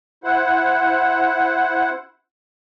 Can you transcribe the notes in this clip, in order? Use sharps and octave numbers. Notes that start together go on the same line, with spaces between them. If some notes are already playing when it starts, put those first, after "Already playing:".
E4 C5 F#5